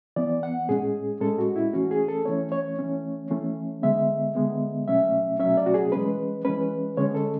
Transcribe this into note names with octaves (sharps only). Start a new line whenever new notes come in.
E3 B3 D5
F#5
A2 G#3 C#4 G#4
A2 G#3 C#4 A4
F#4
E4
E3 A3 C#4 F#4
G#4
A4
E3 A3 C#4 C#5
C#5
E3 A3 C#4
E3 A3 C#4
D3 G#3 B3 E5
D3 G#3 B3
B2 F#3 A3 C#4 E5
B2 F#3 A3 C#4 E5
D5
F#4
G#4
E3 G#3 C#4 B4
E3 G#3 C#4 B4
D3 G#3 C#4 C#5
A4